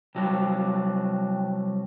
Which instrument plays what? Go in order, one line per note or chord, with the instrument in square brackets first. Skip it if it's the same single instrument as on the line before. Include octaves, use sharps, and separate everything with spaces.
[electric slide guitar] C3 F#3 G3